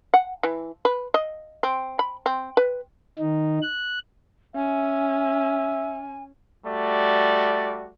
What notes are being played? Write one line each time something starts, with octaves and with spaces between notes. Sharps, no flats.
F#5
E3
B4
D#5
C4
B5
C4
B4
D#3 D#4
F#6
C#4 E5 G#5
G3 A3 F#4 D5